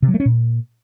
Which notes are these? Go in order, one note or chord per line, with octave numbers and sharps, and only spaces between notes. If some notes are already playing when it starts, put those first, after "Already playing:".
C3
F#3
A3
C#4
A#2